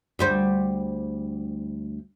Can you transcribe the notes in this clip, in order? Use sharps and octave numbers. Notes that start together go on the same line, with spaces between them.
D2 G3 C5